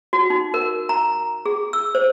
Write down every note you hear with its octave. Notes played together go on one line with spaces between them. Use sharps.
F#4
D#4
A#4
A#5
G#4
E6
C5